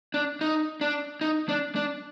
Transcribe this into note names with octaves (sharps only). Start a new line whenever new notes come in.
D4
D#4
D4
D#4
D4
D4